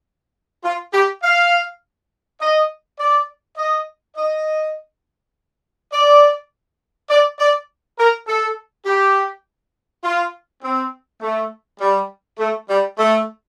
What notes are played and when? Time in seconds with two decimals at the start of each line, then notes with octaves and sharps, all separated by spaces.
0.63 F4
0.94 G4
1.23 F5
2.41 D#5
2.99 D5
3.58 D#5
4.17 D#5
5.92 D5
7.10 D5
7.39 D5
7.99 A#4
8.27 A4
8.86 G4
10.04 F4
10.63 C4
11.22 A3
11.80 G3
12.39 A3
12.69 G3
12.98 A3